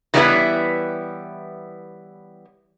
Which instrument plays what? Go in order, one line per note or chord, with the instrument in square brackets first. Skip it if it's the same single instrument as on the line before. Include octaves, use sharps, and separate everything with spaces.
[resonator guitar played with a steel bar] E3 G3 B3 C#4 E4 B4